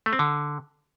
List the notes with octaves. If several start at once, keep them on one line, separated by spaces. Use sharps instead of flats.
A3
C4
D3